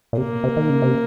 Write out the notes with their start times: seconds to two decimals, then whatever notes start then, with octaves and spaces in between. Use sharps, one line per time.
0.13 A#2
0.18 C3 A#3
0.44 C3
0.57 D#3
0.70 C#3
0.82 C3